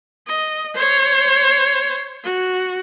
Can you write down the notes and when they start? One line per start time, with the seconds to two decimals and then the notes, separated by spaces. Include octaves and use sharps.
0.27 D#5
0.75 C5 C#5
2.24 F#4